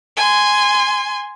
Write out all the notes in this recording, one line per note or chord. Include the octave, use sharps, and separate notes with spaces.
G#5 C6